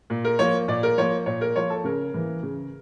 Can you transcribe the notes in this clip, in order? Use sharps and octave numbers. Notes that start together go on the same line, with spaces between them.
A#2
A#4
F3 A#3 C#5
A#2 D5
A#4
F3 A#3 C#5
A#2 C#5
A#4
F3 A#3 C#5
A4
C#3 A#4
E3 A#3
C#3